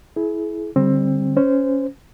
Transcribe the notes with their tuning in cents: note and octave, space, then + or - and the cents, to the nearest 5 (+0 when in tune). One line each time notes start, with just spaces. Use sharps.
E4 +0 G#4 +35
D3 +0 G3 +5 C4 +20
C#4 +0 C5 -20